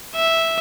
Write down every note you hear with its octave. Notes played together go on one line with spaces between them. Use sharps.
E5